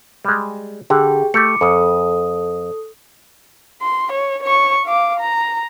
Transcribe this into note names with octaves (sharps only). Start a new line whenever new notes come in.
G3 G#3
D3 G4 G#4 G5
A3 G4 D6 C#7
F2 A4 D#6
C6
C#5
C#5 C#6
F5 D6
A#5